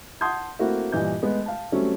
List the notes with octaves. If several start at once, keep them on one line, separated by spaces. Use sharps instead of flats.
F#5 A5 C6 D#6 G6 G#6
A3 A#3 C4 E4 F#4
G2 A#2 E3 D#5 G6
G#3 A3 B3
F5 A5
F#3 G3 A3 C4 C#4